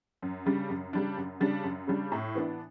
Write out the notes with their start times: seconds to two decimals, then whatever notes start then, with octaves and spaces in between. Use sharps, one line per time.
0.22 F#2
0.46 C#3 G3 D4
0.70 F#2
0.93 C#3 G3 D4
1.17 F#2
1.40 C#3 G3 D4
1.64 F#2
1.87 C#3 G3 D4
2.12 A2
2.35 E3 B3 D4